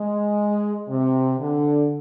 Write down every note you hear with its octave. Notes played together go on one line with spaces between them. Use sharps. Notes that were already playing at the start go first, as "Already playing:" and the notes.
Already playing: G#3
C3
D3